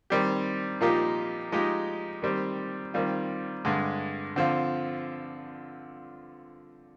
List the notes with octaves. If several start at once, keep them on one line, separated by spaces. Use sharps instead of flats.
D#3 G3 C4 G4
A#2 F3 A#3 D#4 G4
F3 G#3 D#4 G4
D#3 G3 C4 G4
D#3 G3 C4 F4
G2 D3 G#3
D3 F3 C4 F4